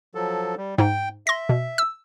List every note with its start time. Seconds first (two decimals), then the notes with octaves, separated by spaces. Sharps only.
0.15 F3 F#3 A4
0.57 G3
0.78 G#2 D#4 G5
1.27 E5 C6 A#6
1.49 B2
1.78 E6